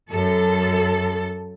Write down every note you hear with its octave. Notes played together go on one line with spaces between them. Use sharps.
F#2 A4